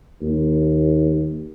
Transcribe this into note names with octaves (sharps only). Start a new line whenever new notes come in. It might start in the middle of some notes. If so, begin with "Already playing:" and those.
D#2